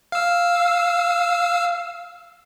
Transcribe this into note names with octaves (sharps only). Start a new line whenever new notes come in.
F5 E6